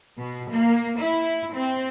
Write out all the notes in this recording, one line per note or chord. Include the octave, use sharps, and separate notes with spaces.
B2
A#3
E4
C4